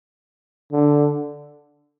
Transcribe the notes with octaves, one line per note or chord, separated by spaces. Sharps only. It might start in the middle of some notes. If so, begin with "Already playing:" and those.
D3